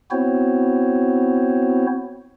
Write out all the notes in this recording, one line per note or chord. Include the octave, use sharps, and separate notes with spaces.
B3 C4 E4 F#4 C5 C#5